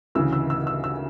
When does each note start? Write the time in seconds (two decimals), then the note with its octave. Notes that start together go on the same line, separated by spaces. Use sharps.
0.15 D2 C#3 E3 E6
0.33 E6
0.50 E6
0.67 E6
0.84 E6